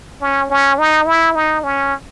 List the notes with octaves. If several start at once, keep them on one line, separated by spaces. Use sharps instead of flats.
C#4
C#4
D#4
E4
D#4
C#4